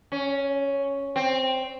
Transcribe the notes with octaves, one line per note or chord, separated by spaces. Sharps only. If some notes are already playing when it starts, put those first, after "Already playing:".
C#4
C4